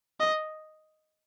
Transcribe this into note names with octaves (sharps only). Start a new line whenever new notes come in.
D#5